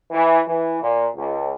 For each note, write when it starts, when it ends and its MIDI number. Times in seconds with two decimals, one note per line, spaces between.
0.11 0.39 52
0.46 0.80 52
0.82 1.07 46
1.15 1.51 37